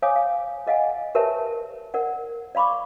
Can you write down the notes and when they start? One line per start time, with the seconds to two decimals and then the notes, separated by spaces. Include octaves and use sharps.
0.02 C#5 F5 G#5 D6 D#6
0.16 F5
0.67 G#4 D#5 F5 F#5 G#5
1.15 G4 A#4 B4 C#5 E5 A5
1.94 A#4 D5 F#5
2.55 D5 F5 B5 C#6 D6